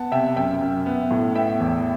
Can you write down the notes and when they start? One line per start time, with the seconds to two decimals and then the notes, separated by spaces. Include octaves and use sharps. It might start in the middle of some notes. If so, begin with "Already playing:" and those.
Already playing: B3 F#5 A5
0.12 C3 E5 G5
0.36 F#2 E5 G5
0.61 F#2
0.86 B3
1.11 A2
1.35 B3 E5 G5
1.60 E2